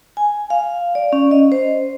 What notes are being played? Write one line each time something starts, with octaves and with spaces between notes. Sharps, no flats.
G#5
F5
D5
C#4
D#5
C5